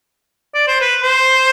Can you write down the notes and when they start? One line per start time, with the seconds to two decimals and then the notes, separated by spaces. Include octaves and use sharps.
0.54 D5
0.68 C5
0.81 B4
1.02 C5